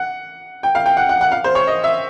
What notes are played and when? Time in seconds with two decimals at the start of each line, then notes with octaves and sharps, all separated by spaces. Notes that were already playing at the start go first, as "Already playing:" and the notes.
Already playing: F#5
0.63 G5
0.75 F5
0.86 G5
0.97 F#5
1.09 F#5
1.21 F#5
1.32 F5
1.44 C5
1.55 C#5
1.67 D#5
1.84 E5